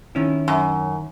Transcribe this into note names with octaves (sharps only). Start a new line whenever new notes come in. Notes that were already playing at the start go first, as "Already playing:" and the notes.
D#3 C#4 E4
F#2